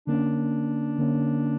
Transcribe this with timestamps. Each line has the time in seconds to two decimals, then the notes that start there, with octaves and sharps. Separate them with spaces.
0.07 D3 A#3 C#4 D4
0.99 D3 A#3 C#4